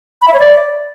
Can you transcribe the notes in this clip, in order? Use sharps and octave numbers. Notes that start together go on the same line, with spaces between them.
B5
E5
C#5
D5